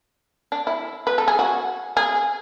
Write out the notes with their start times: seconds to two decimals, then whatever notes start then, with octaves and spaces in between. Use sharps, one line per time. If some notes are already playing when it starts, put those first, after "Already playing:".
0.52 D4
0.67 E4
1.07 B4
1.18 A4
1.28 G#4
1.39 F#4
1.97 G#4